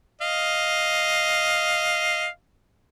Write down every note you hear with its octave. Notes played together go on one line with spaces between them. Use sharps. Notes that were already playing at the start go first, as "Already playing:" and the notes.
D#5 F5